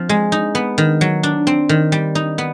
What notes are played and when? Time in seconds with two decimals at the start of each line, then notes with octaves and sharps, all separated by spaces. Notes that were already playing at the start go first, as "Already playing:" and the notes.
Already playing: F3 C4
0.09 G#3
0.32 D#4
0.55 B3
0.78 D#3
1.01 F#3
1.23 D4
1.47 C4
1.69 D#3
1.92 G3
2.15 D#4
2.38 B3